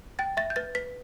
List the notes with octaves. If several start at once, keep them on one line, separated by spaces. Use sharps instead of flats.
G5 A6
E5 A6
G6
B4 A6
B4 B6